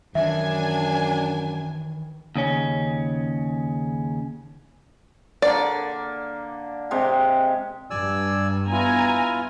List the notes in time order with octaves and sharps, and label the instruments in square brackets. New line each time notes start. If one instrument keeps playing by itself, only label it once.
[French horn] F#2 [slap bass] D#3 E3 [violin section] D4 G#5 [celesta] E5
[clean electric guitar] D#2 C#3 C#4
[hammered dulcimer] D3 A#3 [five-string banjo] D5
[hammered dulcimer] C3 G#3 G4
[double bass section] G2 [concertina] D5 G#5 E6
[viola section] B3 G#5 A#5 [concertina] E4 F4